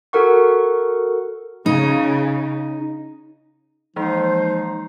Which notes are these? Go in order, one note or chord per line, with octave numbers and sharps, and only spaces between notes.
F#4 A4 A#4 F#5 C#6
C#3 D#4
E3 F3 G#3 A#3 D#4 C5